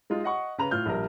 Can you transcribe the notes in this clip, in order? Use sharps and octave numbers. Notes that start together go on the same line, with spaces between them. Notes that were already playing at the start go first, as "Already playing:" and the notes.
G#3 D#4 F4
D#5 F#5 C#6
C#3 B4 A#5 F7
A2 F4 F6 G6
A#1 G3 A#4